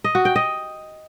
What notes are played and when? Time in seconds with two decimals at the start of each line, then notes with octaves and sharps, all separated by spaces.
0.04 D#5
0.15 F#4
0.25 G5
0.36 D#5